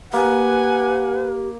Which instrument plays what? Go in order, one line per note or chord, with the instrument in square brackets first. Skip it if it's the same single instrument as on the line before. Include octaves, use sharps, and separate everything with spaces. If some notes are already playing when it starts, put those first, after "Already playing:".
[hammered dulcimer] A#3 [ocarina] G4 [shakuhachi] B4 [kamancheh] F#5 G#5